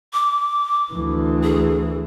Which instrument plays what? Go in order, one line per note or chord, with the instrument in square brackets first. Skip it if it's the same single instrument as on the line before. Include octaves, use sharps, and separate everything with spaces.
[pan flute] D6
[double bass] D2 E3
[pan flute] G#4